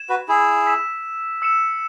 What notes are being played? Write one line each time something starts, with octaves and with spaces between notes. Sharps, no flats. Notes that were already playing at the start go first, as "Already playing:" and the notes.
Already playing: G#6 E7
F#4 B4
E4 G#4
E6 B6 E7
E6 C#7 E7